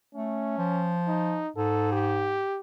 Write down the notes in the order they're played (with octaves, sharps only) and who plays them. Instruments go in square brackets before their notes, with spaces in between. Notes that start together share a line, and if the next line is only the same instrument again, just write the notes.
[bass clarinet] A3 [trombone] C#4
[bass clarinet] F3
[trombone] D#4
[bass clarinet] G#2 [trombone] A4
[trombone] G4